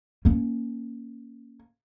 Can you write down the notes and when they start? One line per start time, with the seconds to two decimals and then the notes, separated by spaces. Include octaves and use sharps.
0.25 A#3 C#4